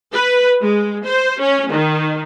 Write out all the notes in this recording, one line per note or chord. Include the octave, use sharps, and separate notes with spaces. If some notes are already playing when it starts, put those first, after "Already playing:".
B4
G#3
C5
C#4
D#3